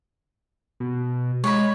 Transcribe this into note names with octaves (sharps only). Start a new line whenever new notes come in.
B2
G#3 C#5 B5